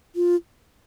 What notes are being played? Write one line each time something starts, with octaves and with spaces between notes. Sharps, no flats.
F4